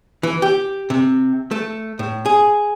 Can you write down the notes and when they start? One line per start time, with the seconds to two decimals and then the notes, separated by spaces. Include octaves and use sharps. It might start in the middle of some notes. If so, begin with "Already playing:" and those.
0.23 E3
0.42 G4
0.90 C3
1.51 A3
1.99 A2
2.26 G#4